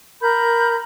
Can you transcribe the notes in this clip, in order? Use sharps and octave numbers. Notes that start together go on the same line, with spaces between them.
A#4 B5 G6